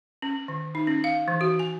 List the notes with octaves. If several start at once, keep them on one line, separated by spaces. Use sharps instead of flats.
C#4
D#3
D#4
C#4
F5
E3
F#4
G#5